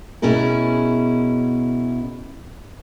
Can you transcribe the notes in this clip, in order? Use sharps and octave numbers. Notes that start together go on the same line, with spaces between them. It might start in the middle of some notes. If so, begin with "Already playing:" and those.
B2 C#4 E4 G#4 A#4